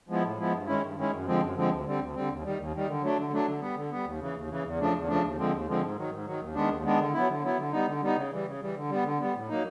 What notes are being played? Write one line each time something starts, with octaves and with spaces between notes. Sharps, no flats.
F3 G#3 B3 E4
A2
F3 G#3 B3 E4
G2
D#3 G#3 C#4 E4
G2
D#3 G#3 C#4 E4
F#2
D3 F3 G#3 C4
F#2
D3 F3 G#3 C4
D2
D3 G3 C4
D2
D3 G3 C4
D#2
D#3 G3
D#2
D#3 G3
D3
F#3 A3 D4
D3
F#3 A3 D4
D3
G3 B3
D3
G3 B3
D#2
C#3 E3
D#2
C#3 E3
E2
C#3 F3 A3 D4
E2
C#3 F3 A3 D4
D#2
D3 F3 G#3 C4
D#2
D3 F3 G#3 C4
G#2
D#3 F#3
G#2
D#3 F#3
D#2
D#3 G#3 B3 D4
D#2
D#3 G#3 B3 D4
D3
F#3 B3 E4
D3
F#3 B3 E4
D3
G3 B3 D#4
D3
G3 B3 D#4
C#3
E3 G3
C#3
E3 G3
D3
G3 B3
D3
G3 B3
A2
F#3 A#3 D#4